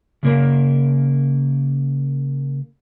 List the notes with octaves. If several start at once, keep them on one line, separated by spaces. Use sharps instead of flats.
C#3 A#3 A#4